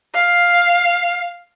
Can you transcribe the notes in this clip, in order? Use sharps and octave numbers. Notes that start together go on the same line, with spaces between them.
F5